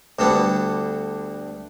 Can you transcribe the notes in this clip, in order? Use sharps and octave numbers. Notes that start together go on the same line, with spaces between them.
D2 D3 G3 B3